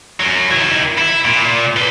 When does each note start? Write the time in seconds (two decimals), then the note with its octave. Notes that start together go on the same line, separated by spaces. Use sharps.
0.20 F#2 F#3
0.51 D#3 E4
0.98 E4
1.25 A#2
1.77 B4 C6